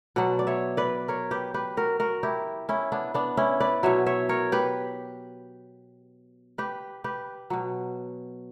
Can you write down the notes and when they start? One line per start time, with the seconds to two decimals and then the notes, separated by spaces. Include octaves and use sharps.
0.16 B2 F#3 D5 F#5
0.39 D5
0.47 C#5 E5
0.77 B4 D5
1.08 A#4 C#5
1.31 G4 B4
1.54 G4 B4
1.77 F#4 A#4
2.00 F#4 A#4
2.23 E4 G4
2.69 C#4 E4
2.92 B3 D4
3.14 B3 D4
3.37 C#4 E4
3.60 B4 D5
3.83 B2 F#3 C#5 E5
4.06 C#5 E5
4.29 A#4 C#5
4.52 G4 B4
6.58 G4 B4
7.04 G4 B4
7.50 B2 F#3